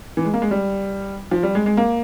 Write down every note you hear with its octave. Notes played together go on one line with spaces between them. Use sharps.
E3
G#3
A#3
G#3
G3
F3
G3
G#3
G#3
A#3